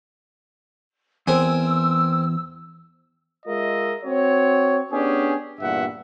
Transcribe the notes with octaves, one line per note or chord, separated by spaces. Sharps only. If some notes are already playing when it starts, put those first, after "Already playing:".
E2 C4 A#4 G#5 E6
G#3 F4 A#4 D#5 E5
C4 F#4 C#5
B3 C#4 D4 G4 G#4
E2 G2 A#2 E5 F#5